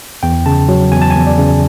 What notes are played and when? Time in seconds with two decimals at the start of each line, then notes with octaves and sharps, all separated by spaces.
0.23 E2 G5
0.46 C#3 A5
0.68 F#3
0.92 E2 G#5
1.02 A5
1.11 E2 G#5
1.27 D5
1.38 C#3